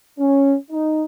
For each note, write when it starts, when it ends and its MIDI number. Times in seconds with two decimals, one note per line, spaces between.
0.19 0.55 61
0.70 1.04 63